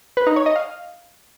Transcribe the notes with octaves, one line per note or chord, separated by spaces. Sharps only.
B4
D#4
C#5
D#5
F5